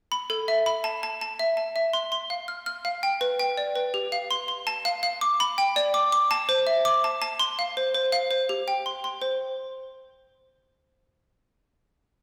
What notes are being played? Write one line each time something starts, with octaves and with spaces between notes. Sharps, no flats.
B5
A4
E5
B5
A5
A5
A5
E5
A5
E5
C6
C6
F5
F6
F6
F5
G5
B4
G5
D5
B4
G4
F5
C6
C6
A5
F5
F5
D6
B5
G5
D5
D6
D6
A5
C5
E5
D6
A5
A5
C6
F5
C5
C5
F5
C5
G4
G5
C6
C6
C5